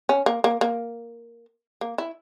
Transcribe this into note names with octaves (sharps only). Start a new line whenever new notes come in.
C#4
A#3
A#3
A#3
A#3
E4